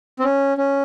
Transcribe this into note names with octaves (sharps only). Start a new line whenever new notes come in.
C4
C#4
C#4